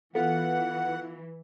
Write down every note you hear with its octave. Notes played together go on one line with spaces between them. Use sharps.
E3 B3 F4 A4 F#5